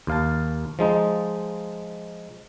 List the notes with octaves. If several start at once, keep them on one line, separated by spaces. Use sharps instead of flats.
D#2 F5 A5
F3 G#3 D#4